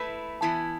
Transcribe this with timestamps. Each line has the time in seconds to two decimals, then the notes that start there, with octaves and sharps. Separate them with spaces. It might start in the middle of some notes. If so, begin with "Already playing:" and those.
Already playing: A3 E4 B4 B5
0.41 E3 B3 E4 A5